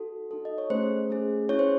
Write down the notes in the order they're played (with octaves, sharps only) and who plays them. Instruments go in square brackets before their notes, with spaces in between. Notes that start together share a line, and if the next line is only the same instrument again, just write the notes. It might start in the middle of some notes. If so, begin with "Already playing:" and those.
Already playing: [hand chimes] D#4 F#4 A4
D#4 F#4 A4
D#5
C#5
A3 C#4 G#4 C5
A3 C#4 G#4
C#4 E4 G#4 C#5
C5